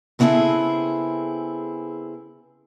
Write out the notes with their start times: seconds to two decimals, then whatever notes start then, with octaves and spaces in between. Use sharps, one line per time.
0.19 C#3 B3 C4 E4 G#4 A4